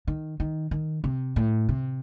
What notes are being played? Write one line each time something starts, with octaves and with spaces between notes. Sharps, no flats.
D#3
D#3
D#3
C3
A2
C3